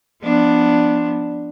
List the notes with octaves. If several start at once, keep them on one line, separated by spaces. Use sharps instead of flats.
F3 B3 D4